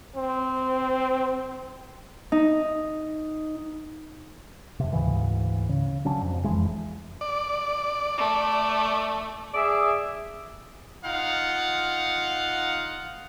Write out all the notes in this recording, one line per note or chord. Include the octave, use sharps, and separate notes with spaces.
C4
D#4
F2 C3
D2 G#2 C#3 E3
C#3
C#3 F#3 C#4 D4
F2
F#1 F2 E3 G#3
D5
A3
G#4 D5 E5
D#4 F4 F5 F#5